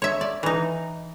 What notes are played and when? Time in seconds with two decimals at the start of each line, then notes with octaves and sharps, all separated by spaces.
0.02 C#5 E5
0.21 D5
0.43 E3 D#4